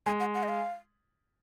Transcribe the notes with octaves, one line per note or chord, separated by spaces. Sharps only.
G#3 G#5
F#5
F#5
D#5
F5